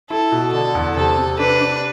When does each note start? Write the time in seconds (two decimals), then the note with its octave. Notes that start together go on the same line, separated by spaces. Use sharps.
0.10 E4 A4
0.32 B2
0.53 D3 A4
0.75 E2
0.96 C3 A4
1.18 C3
1.39 D4 B4
1.61 D4